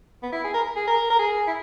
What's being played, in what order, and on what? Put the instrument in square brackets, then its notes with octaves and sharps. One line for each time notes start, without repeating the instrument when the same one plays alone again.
[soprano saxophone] B3
E4
G#4
A#4
G#4
A#4
A#4
G#4
E4